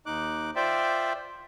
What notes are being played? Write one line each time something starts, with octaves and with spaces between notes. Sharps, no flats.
D#2 D#4 D6 F#6
F4 C5 D5 E5 G5